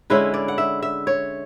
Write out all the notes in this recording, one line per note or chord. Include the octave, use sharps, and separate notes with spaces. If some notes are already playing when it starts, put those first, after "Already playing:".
D3 G#3 C#4 E4 B4
D5
F#5
E5
E5
C#5